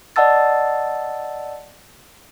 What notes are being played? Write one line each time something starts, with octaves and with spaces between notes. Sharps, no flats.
D5 D#5 F#5 A5 E6 A6